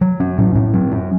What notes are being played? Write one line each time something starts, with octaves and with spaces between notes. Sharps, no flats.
F#3
C#4
A2
A2
F#3
C#4